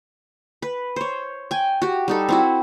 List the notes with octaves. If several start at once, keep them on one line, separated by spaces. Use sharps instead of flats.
B4
C5 C#5
G5 G#5
F#4 G4
G3 D#4 A4
C4 E4 F#4